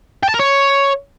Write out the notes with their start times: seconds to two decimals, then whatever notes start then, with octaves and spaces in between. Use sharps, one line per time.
0.23 G5
0.29 A5
0.34 A#4
0.39 C#5